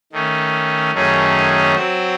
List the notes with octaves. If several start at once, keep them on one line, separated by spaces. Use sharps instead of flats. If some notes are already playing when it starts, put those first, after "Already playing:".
D#3 A3 C#4
F#2 D#3 A3 C#4 G#4
F#3 C4 F#4 C5